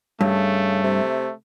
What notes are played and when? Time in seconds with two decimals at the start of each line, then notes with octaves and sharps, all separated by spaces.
0.21 G2 C#3 A3
0.83 C3